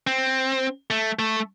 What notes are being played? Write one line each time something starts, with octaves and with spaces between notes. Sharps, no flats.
C4
A3
A3